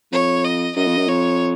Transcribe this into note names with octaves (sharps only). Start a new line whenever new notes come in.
F2 C#5
D#5
F#2 D#5
F2
F#2
F2 C#5